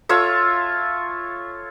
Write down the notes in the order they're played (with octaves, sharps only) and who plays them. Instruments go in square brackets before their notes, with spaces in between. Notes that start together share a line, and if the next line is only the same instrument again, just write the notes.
[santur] F4 A4 C#5 E5